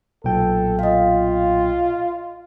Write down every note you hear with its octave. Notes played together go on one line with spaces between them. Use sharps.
B1 A#2 A4 G5
F4 D#5 F5